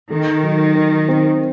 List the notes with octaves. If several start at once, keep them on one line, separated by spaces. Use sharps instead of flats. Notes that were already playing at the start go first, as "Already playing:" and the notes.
D#3 A4
F#3
D#4
C4